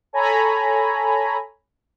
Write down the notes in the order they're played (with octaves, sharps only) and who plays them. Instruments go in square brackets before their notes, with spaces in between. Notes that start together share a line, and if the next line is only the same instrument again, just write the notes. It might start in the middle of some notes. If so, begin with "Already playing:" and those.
[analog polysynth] A4 C#5 G#5 A#5 B5